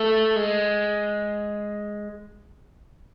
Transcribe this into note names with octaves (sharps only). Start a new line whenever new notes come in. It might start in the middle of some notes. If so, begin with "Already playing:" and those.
Already playing: A3
G#3